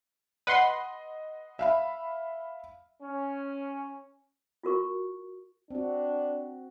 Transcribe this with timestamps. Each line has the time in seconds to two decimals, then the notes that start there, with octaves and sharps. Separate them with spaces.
0.47 B4 D#5 F#5 C6
1.59 E5 F5 B5
3.01 C#4
4.63 F4 F#4 A#4 C#6
5.71 C4 D4 F#4